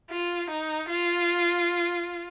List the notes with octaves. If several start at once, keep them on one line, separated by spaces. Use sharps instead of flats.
F4
D#4
F4